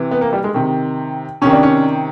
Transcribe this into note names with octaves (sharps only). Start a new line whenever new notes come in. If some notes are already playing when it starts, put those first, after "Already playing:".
Already playing: C3 E3
B3
A#3
G3
G#3
C3 D#3
C3 D#3 C#4
D4
C#4